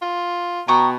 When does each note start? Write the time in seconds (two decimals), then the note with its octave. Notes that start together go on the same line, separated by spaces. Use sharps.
0.02 F4
0.68 B2 G5 A#5 C#6 D#6